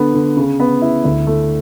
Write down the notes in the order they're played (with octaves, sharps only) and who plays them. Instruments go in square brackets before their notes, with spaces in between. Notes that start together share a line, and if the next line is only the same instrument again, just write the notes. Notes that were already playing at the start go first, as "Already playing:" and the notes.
Already playing: [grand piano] D3 B3
D3
C#3
B3
E4
D2
A3